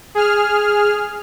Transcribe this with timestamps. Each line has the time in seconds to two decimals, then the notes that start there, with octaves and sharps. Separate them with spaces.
0.15 G#4 F6